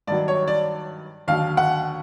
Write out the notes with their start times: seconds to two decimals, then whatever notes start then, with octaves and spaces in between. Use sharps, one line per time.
0.07 G2 D#3 F#3 D5
0.28 C#5
0.48 D5
1.28 D#2 D3 F#3 F5
1.57 F#5